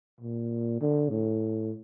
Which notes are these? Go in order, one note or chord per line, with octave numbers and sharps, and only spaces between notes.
A#2
D3
A2